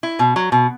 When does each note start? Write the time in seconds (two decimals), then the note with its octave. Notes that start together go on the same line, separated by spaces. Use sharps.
0.03 E4
0.19 B2
0.36 F#3
0.52 B2